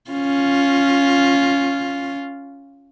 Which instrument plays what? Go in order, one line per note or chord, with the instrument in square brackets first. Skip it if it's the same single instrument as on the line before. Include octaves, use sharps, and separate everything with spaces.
[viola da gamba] C#4 F4